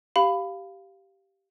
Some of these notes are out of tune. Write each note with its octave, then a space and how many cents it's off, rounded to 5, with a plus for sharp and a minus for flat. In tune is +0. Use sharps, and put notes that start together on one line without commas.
G4 -10 F5 +0 B5 +15